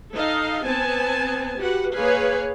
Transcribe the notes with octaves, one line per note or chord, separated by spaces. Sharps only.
D#4 A4 D#5 F5
B3 C4 G#5 A5
F#4 G4 B4 F#5
A#3 G#4 B4 C#5 F5 G#5